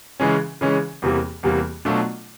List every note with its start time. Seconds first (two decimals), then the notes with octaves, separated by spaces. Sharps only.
0.20 C#3 E3 G#3 C#4
0.61 C#3 E3 G#3 C#4
1.02 E2 C3 E3 G3 A#3
1.43 E2 C3 E3 G3 A#3
1.85 B2 F#3 A3 D4 F4